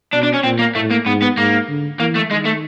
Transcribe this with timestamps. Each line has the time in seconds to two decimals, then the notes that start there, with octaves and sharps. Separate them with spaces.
0.13 B2 D4
0.23 D4
0.34 C#4
0.44 A#2 C4
0.59 A#3
0.75 A2 A3
0.91 A#3
1.06 G#2 B3
1.22 B3
1.37 G#2 A#3
1.68 D3
1.99 E3 A#3
2.15 A3
2.30 D#3 G#3
2.45 A3